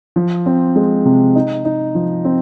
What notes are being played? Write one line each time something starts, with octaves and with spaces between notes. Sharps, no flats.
F3
C4
G#3
C3
D#4
D#4
F3
C4